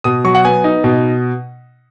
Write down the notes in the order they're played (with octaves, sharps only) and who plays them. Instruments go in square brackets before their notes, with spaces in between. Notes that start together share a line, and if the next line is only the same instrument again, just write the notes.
[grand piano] B2 D#6
F#3 C#6
F#5
B3 G#5
D#4
B2